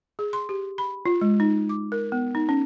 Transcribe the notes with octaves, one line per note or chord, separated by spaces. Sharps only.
G#4
C6
G4
B5
F4
G#3
D#4
D6
A#4
B3
D#4
C#4